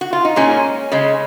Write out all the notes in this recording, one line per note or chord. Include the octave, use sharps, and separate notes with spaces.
F#4
F4
D#4
A#2 G#3 C#4
C#3 G#3